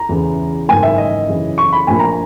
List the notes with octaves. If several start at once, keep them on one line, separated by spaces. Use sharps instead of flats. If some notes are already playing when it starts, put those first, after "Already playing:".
Already playing: A#5
E2 C#3 E3
G#1 F#2 C#3 E3 A#3 G#5
E5
D#5
F#2 C#3 E3
C#6
B5
A#1 A#2 A#3 G#5
A#5